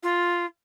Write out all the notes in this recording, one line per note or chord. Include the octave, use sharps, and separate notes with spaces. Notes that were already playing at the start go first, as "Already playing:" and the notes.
F4